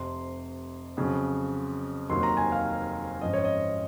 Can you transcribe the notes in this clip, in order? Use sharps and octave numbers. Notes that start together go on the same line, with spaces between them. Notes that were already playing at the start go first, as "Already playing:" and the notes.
Already playing: F1 F2 C3 C6
F2 C#3 F#3
F1 D#2 D#3 F#3 C6
A#5
G#5
F5
G#1 F#2 F3 D#5
C#5
D#5